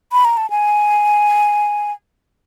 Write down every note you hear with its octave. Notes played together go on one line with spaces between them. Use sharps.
B5
A#5
A5
G#5